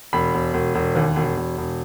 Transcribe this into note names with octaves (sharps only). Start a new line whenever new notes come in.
E1 B5
E1
E1
E1
D#2
E1
E1
E1